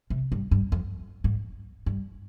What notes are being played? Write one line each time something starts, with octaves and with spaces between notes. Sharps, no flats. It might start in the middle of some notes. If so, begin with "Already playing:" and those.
C3
G2
G2
F2
G#2
G2